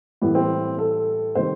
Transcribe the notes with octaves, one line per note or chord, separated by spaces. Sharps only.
A2 E3 G3 B3
C4
A4
C3 D#3 G3 C5